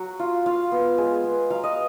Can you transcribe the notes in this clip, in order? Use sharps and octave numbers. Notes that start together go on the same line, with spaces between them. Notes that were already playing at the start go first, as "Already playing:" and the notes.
Already playing: F#3 F#4
F4
F4 F5
B3
G#3
B3
F#3 F5
D#5